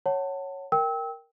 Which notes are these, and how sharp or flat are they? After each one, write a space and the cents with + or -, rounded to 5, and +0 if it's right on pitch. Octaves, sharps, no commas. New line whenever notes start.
C#5 -5 F#5 +10 A5 +25
A#4 +0 G5 +0 E6 -30